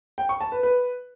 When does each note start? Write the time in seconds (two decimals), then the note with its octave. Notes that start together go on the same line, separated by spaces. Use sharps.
0.18 G5
0.29 C#6
0.41 A5
0.52 B4
0.63 B4